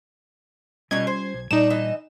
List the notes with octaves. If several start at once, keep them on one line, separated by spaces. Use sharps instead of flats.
B2 F#3 G3 C#4 F4 D#5 G#6
C5
B1
A#2 G3 D4 D#4 E7
E3 D#5